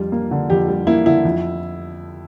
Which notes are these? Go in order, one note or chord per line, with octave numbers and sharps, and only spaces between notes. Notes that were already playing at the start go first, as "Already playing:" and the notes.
Already playing: F2 G3 F4
A#3
D3
F2 G4
G3
A#3 E4
D3 E4
F2